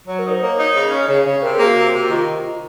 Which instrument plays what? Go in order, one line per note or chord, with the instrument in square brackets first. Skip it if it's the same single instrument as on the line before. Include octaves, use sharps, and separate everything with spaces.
[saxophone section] F#3 [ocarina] C#5
[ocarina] A#4
[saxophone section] D#4
[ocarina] C5
[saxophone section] A#3 [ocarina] C#5
[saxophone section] D#4
C#3
C#4
C#3
C#3
[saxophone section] C3 [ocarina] A#4
[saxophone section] A#3 [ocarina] G#4
[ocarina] F#4
[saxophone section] C3
C3
[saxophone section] D#3 [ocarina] F4